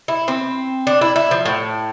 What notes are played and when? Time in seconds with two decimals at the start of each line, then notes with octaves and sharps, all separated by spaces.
0.08 E4
0.28 C4
0.87 D4
1.01 E4
1.16 E4
1.31 F3
1.46 A2